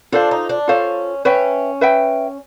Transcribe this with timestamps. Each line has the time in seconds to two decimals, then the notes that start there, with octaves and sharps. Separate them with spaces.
0.12 D4 F4 A4 C5 F5
0.31 D#4
0.49 D4
0.68 C#4 F4 A4 C5 F5
1.25 C#4 B4 E5 G5
1.81 B4 E5 G5